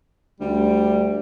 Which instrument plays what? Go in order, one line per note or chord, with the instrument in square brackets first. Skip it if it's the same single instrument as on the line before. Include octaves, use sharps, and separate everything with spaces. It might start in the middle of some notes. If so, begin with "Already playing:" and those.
[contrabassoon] D2 [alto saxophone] G3